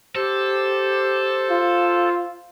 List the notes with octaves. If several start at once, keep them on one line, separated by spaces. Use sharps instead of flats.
G4 A4 C5
F4